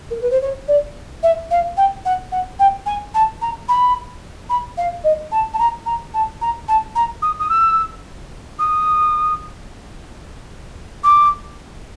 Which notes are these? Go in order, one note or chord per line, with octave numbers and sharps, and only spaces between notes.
A#4
B4
C5
C#5
D5
E5
F5
G5
F#5
F#5
G5
G#5
A5
A#5
B5
B5
F5
D#5
A5
A5
A#5
A#5
A5
A#5
A5
A#5
D#6
D#6
E6
D#6
D6